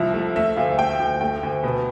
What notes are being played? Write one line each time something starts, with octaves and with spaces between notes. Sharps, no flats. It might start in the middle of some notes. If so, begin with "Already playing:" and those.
Already playing: C2 F3 E5
A3
A3 E5
D2 F5
A3 G5
D2
A3 G5
D2
B2